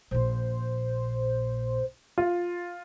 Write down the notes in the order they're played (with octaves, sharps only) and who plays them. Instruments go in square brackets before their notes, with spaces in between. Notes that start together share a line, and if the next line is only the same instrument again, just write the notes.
[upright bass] A#1 A#2 [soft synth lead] C5
[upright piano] F4